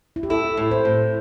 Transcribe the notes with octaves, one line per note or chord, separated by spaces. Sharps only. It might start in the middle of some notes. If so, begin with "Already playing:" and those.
E4
G4
E4 A4
A2
C5
A2